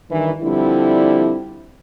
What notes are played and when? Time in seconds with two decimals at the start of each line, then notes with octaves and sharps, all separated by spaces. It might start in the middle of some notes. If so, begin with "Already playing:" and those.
0.10 G2 D#3 E3
0.42 D3 F3 G3 C4 E4